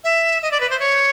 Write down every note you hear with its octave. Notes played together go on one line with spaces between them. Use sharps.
E5
D#5
D5
B4
C5
C#5